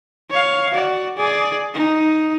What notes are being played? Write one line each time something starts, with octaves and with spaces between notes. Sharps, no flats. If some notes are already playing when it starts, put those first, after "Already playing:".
C#5 F5
F#4 D5
G#4 D5
D#4